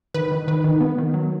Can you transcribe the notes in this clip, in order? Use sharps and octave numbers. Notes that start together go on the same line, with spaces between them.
D#3 B4
D#3
D#3 B4
D#3
B3
D#3
F#3